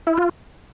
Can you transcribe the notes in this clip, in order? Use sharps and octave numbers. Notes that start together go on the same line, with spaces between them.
E4
F4